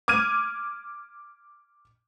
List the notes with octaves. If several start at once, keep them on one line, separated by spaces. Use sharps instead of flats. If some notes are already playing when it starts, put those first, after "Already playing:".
D6 F6 G#6 D#7